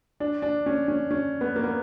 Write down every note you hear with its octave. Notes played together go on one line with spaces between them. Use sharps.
D4
D4
C#4
C#4
C#4
B3
A#3
B3